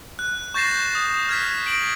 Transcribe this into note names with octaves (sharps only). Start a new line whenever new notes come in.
F#6
C#6 G6 A6 A#6 C7 E7
D#6
F6 G#6 B6
A#6 D7 F#7